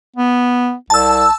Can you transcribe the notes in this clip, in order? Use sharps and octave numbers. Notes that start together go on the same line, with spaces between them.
B3
C2 A5 E6